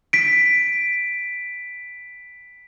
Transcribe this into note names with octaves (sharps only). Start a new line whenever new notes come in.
B6 D7